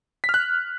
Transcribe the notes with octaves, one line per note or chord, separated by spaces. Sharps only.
B6
F6
F#6